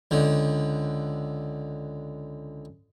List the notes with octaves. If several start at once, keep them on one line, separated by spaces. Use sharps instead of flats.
C#2 D3